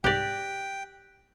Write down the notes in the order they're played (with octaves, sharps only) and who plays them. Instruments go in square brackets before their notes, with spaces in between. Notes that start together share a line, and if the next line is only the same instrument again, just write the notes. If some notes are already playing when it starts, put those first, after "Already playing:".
[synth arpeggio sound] C2 G#2 [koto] G4 D5 [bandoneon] G5 [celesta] F#6 A#6 B6